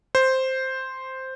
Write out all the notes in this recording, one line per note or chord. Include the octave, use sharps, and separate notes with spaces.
C5